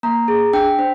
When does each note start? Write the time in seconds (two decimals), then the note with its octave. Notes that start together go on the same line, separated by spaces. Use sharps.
0.03 A#3 A#5
0.28 G#4
0.53 D4 G5
0.79 D4 C5